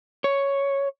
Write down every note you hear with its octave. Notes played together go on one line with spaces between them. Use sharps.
C#5